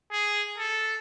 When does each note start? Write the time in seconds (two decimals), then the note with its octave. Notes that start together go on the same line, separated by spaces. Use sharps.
0.11 G#4
0.58 A4